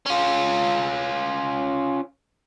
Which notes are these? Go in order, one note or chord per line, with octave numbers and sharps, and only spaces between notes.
C#4 F4